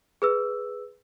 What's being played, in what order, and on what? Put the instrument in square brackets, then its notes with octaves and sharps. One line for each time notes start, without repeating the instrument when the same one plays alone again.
[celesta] G#4 B4 E6